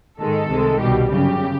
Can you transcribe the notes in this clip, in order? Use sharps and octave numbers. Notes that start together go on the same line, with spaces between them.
G#2 D#3 G#3 A4
C2 C3 D#3 G#3
C2 B2 G3 G4
G1 F#2 C#3 G4